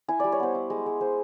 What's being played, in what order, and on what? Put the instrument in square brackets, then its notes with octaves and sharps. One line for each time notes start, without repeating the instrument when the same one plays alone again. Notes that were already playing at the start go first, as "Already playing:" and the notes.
[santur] E4 G#5
G3 D5
C#5
B3 C5
E4
G#3
G#3
G#3 C5